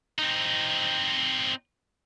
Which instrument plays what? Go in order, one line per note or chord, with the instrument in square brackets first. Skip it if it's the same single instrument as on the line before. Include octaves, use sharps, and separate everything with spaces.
[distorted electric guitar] C4 D#4